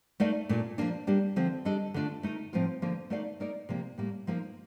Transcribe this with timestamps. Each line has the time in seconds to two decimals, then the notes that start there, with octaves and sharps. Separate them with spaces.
0.20 A3 D#4 A#4 D5 F5
0.49 A#2 A3 D4 F4
0.78 F3 A#3 D4
1.07 G3 A#3 D4 G4
1.36 D3 F3 C4
1.65 G3 D4 A4 D#5
1.94 D3 A3 D4 F4
2.23 A3 D#4 A#4
2.53 A2 F3 C4 F4 A#4
2.82 D3 F3 A#3
3.10 A3 D#4 A#4 D5 F5
3.40 A#3 D#4 A#4 D5
3.69 C3 F3 A#3
3.98 A2 G3 A#3
4.27 F3 A#3 D#4 A#4 F5